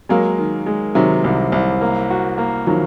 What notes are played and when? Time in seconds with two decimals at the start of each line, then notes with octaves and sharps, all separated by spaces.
0.09 F#3 G#3 A#3
0.38 D#3
0.66 G#3
0.95 C3 D#3 F#3
1.24 C2
1.52 C2
1.81 A#3
2.10 F#4
2.38 A#3
2.67 D#3 F3 F#3